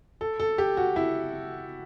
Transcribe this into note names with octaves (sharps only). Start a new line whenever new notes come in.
A4
A4
G4
F#4
E4